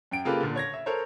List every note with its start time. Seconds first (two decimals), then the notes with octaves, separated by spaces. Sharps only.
0.11 F#2 G5 D7
0.25 C#3 A#3 F4 G4 A4 B4
0.41 A#2 D3
0.56 C#5 G#6 A#6
0.74 E5
0.86 A4 A#4 C5 C#5